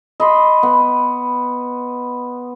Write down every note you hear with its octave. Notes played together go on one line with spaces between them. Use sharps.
D#5 B5 C6
B3